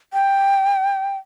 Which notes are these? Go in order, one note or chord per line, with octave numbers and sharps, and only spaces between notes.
G5